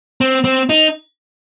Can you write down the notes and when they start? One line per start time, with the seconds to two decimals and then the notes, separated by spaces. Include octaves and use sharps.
0.21 C4
0.44 C4
0.69 D#4